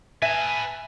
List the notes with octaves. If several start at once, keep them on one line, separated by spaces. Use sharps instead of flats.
B4 E5 G#5 A5